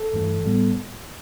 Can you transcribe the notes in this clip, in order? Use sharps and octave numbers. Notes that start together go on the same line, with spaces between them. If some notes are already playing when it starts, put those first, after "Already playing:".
Already playing: A4
G2 E3 A3
A2 G3 B3